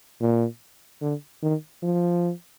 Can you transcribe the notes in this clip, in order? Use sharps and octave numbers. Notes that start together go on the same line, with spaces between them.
A#2
D3
D#3
F3